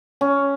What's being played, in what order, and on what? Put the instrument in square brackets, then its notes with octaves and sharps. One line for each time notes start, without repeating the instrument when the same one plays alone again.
[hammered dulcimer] C#4